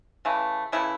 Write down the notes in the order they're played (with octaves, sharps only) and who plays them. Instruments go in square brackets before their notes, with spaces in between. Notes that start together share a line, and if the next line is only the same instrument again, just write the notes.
[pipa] C#3 E3 A3
C#3 E3 A3 E4